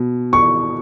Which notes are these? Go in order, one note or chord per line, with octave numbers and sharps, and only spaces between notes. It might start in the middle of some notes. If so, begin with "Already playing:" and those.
Already playing: B2
C#6